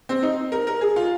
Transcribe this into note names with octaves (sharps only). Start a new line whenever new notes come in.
C4
D#4
A#4
A#4
G#4
F4